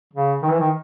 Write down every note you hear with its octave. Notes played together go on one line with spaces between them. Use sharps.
C#3
D#3
E3
D#3